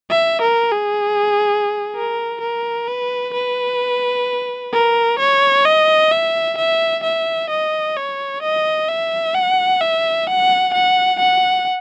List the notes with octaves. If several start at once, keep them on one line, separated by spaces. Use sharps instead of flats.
E5
A#4
G#4
A#4
A#4
B4
B4
A#4
C#5
D#5
E5
E5
E5
D#5
C#5
D#5
E5
F#5
E5
F#5
F#5
F#5